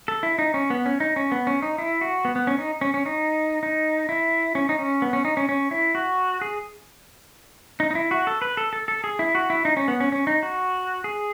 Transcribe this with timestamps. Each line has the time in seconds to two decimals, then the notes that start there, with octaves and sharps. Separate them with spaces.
0.08 A4
0.23 E4
0.39 D#4
0.54 C#4
0.70 B3
0.86 C#4
1.00 D#4
1.16 C#4
1.32 B3
1.47 C#4
1.62 D#4
1.78 E4
2.01 F#4
2.25 B3
2.36 B3
2.47 C#4
2.58 D#4
2.81 C#4
2.94 C#4
3.06 D#4
3.63 D#4
4.09 E4
4.55 C#4
4.69 D#4
4.79 C#4
5.02 B3
5.13 C#4
5.25 D#4
5.37 C#4
5.49 C#4
5.71 E4
5.95 F#4
6.41 G#4
7.80 D#4
7.91 D#4
7.95 E4
8.11 F#4
8.27 A4
8.42 B4
8.57 A4
8.73 A4
8.88 A4
9.04 G#4
9.19 E4
9.35 F#4
9.50 E4
9.65 D#4
9.77 C#4
9.88 B3
10.00 C#4
10.12 C#4
10.27 D#4
10.43 F#4
11.04 G#4